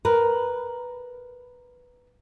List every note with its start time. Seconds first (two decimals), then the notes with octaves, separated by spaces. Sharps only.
0.05 A#4 B4